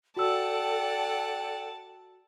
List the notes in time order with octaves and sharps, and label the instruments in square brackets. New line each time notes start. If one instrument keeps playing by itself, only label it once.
[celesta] F#4 E6 [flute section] A4 G5 [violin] D5 F#5 [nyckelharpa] A5